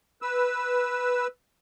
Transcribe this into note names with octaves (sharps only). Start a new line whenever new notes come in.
B4 E6